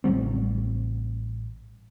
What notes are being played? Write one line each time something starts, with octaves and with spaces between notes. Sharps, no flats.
A1 C#3 G3 C4